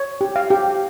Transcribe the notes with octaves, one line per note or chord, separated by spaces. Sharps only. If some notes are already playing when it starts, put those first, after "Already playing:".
Already playing: C#5
G4
F5
G4